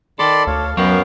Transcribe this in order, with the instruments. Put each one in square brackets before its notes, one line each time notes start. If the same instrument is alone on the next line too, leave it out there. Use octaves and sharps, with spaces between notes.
[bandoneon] D#3 B5 [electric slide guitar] A4 [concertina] D5 C6
[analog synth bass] D2 [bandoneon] C#5 [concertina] F5
[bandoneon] F#2 B3 F5 [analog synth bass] F#3 [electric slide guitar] A#4 C#5 [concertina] G5